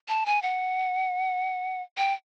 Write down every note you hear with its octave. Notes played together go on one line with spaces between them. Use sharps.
A5
G#5
F#5
G5